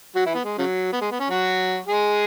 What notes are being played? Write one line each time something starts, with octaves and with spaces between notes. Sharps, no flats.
F#3 F#4
E3 E4
B3
G#3
C#3 F#3
B3
G#3
B3
C#4
F#3 F#4
G#3 G#4